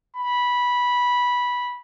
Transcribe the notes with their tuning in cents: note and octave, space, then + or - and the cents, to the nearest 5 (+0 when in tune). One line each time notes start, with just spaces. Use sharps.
B5 -15